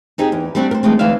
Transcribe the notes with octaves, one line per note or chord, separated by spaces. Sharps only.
C4 D#4 G4 G#4
E2
G3 A3 C4 D4 F#4
A#4 C5
D3 E3 G#3 A3 C4
D2 E3 E4 E5 F5